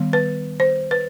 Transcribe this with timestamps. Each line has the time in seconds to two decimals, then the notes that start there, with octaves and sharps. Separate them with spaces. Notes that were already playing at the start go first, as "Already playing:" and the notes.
Already playing: D#3 G3 B3
0.13 B4
0.60 C5
0.91 B4